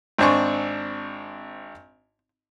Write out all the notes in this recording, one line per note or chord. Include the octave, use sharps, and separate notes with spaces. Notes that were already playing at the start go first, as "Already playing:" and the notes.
G#1 C4 D4 G#5 C#6